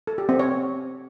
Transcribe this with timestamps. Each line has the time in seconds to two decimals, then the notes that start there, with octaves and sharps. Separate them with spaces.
0.07 A4
0.18 G4
0.29 C4
0.39 C#5